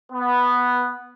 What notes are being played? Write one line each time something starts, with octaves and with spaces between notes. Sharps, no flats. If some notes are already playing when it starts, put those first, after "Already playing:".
B3